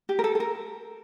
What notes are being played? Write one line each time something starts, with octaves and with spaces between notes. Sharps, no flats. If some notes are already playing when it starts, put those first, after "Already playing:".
G4
A#4
A4
A4
A#4